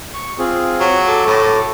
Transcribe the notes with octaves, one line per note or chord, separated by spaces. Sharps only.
C#6
C4 F4 G#4
F#3
A4 D6
A2